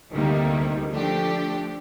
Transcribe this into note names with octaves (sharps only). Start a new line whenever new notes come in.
D2 C3 D#3 G3 A#3
F3 A3 D4 G4